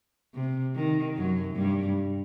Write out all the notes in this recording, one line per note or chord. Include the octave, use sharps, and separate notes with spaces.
C3
D#3
F#2 F#3
G2 G3